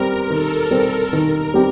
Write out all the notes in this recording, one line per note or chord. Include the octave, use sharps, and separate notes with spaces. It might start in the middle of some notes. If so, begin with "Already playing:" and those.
Already playing: G3 C4 G4 A#4 C5
D#3 A4
G3 C4 G4 C5
D#3 A#4
G3 C4 G4